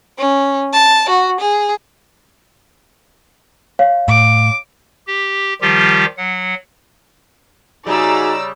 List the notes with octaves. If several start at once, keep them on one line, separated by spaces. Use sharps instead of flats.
C#4
A5
F#4
G#4
C#5 F5
A2 D6
G4
D#3 F3 G3 F4 G4
F#3 F#5
C#3 G3 D#4 F#4 G#4 D5 A#5 E6